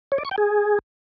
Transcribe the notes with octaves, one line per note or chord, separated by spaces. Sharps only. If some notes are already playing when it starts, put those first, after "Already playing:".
C#5
D5
C#6
G5
G#4